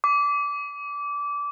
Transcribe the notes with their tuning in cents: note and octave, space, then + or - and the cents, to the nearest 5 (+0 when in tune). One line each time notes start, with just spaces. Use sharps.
D6 -20